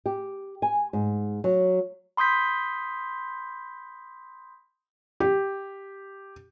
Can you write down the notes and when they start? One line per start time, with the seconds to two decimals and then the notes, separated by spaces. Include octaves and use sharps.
0.06 G4
0.62 G#5
0.93 G#2
1.44 F#3
2.17 B5 C6 D#6 G6 B6
5.20 G4